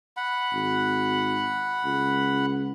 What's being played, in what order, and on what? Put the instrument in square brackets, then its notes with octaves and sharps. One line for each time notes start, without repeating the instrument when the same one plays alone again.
[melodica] F#5 B5
[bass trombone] G#1
C#2